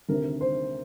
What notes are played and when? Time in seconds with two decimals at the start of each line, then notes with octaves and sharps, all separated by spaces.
0.09 D2 C3 D#3 A#4
0.41 C5